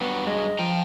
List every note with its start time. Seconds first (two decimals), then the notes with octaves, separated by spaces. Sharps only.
0.01 G2 F#3 B3
0.27 G#3 D#5
0.59 F3 G5 A#5